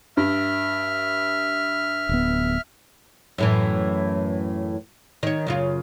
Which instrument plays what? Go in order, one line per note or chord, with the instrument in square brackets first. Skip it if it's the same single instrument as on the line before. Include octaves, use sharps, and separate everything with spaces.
[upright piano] G2 [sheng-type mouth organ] E5 F6
[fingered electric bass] D1 B3
[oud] F#2 A2 E3
D#3 C#5
F#2 C#3 F4